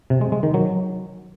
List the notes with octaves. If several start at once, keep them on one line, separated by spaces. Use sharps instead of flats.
C3
G#3
G#3
D#3
F#3